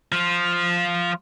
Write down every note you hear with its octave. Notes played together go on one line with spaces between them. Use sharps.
F3 F4